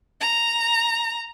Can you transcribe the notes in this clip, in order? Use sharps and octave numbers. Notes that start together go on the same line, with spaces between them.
A#5